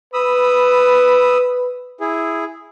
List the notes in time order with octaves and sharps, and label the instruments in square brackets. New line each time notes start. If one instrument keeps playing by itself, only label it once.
[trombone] B4 [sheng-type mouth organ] B5 D#6 E6
[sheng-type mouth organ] E4 G#4